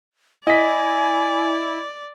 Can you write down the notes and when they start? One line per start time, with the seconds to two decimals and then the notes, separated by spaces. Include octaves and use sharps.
0.47 E4 D5 D#5 G#5 B6